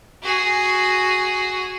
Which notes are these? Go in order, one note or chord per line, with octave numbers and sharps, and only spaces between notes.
F#4 G#4